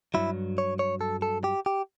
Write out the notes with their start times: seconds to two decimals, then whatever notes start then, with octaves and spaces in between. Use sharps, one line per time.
0.14 G2 F#3 E4
0.58 C#5
0.79 C#5
1.01 A4
1.22 A4
1.44 G4
1.66 G4